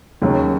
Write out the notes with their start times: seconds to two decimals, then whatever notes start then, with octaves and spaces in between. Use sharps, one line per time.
0.22 D#2 C#3 F#3